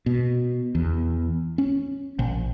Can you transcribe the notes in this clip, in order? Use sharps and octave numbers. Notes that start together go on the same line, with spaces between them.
B2
E2
C#4
A#1